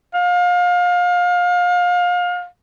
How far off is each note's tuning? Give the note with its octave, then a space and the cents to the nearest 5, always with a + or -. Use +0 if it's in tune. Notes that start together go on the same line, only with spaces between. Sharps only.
F5 +30